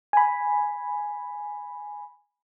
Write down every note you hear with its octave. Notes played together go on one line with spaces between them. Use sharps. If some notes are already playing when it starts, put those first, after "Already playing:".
G#5 B5